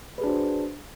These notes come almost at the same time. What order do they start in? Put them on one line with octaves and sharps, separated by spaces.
B4 G#4 D4 F#4 C5